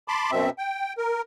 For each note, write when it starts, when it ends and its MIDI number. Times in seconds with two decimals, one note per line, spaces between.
0.08 0.31 81
0.08 0.31 83
0.08 0.31 84
0.08 0.31 86
0.31 0.50 42
0.31 0.50 47
0.31 0.50 60
0.31 0.50 76
0.58 0.93 79
0.98 1.22 70